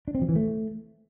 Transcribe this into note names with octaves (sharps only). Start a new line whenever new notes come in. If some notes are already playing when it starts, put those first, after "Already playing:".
D4
C4
F3
E3
A3